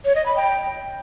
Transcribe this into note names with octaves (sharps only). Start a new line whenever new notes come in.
C#5
D#5
B5
G5